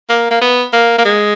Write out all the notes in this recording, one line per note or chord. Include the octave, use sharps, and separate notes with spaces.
A#3
A#3
B3
A#3
A#3
G#3